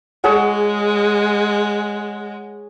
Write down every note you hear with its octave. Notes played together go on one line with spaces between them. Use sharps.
G#3 G#4 C#5 F#5